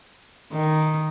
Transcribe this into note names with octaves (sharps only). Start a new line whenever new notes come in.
D#3